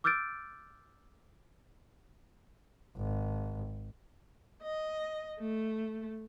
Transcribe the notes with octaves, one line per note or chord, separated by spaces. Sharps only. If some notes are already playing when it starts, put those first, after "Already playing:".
D6 E6 F6 G6 A6 D7
G#1
D#5
A3